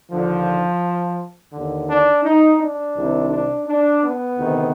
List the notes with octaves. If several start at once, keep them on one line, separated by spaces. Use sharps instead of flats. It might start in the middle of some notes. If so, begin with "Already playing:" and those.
D#2 D3 F3
D#2 D3
D4
D#4
D4
C2 C3 D#3
D4
D4
B3
D2 C3 D#3